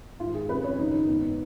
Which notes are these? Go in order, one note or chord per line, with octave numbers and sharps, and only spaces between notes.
G#2 D#3 F4
G#4
F2 C#3 B4
C#5
F#2 D#3 D#4
G#2 D#3 B3